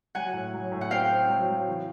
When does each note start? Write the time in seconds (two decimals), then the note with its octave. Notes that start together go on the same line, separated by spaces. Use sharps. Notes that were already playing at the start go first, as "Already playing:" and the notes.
0.15 F#3 F#5 G#5
0.33 A2
0.53 F#3
0.72 A2
0.81 F#5
0.91 C4 F5 G5
1.10 C4
1.29 F#3
1.49 F#3
1.68 E3